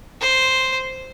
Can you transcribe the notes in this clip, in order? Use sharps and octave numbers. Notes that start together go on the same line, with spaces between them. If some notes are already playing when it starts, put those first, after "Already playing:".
C5